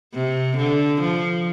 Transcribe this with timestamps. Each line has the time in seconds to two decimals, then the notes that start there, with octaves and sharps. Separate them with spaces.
0.14 C3
0.57 D3
1.01 F3